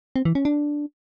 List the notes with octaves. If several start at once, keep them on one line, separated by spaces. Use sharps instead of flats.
C4
E3
C#4
D4